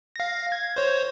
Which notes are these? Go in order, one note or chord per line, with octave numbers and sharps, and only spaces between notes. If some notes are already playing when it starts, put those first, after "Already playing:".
F5 A#6
G#6
C5 C#5